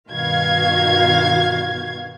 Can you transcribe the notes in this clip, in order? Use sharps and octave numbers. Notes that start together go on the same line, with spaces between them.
G2 B2 D#3 F#4 F5 G#6